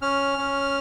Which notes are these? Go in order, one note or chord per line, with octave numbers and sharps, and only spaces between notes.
C#4 F6
C#4